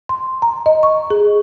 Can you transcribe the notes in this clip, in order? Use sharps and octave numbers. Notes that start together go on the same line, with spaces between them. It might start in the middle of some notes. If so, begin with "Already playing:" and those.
C6
A#5
D#5
C#6
G#4